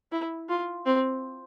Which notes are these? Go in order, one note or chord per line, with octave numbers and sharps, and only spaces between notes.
E4
F4
C4